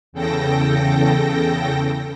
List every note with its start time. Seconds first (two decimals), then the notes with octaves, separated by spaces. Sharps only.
0.13 E2 C#3 A4 G5 A#6